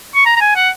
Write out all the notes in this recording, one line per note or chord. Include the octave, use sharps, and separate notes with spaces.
C#6
A#5
A#5
G#5
F#5